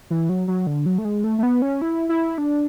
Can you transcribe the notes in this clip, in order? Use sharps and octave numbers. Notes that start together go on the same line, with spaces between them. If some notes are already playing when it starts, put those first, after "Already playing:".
E3
F#3
F#3
D3
F#3
A3
G#3
A3
A3
B3
C#4
E4
E4
D4